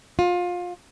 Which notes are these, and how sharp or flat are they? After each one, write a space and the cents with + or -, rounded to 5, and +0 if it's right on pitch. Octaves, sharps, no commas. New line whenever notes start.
F4 +25